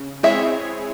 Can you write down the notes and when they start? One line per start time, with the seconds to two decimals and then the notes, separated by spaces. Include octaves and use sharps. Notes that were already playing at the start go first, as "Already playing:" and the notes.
Already playing: C#3
0.23 G#3 C4 E4 G#4 C#5 E5